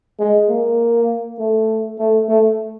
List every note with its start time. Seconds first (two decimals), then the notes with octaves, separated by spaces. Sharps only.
0.19 G#3
0.49 A#3
1.39 A3
1.98 A3
2.28 A3